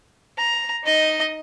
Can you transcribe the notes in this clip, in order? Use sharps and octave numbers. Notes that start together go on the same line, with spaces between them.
A#5
D#4 D#5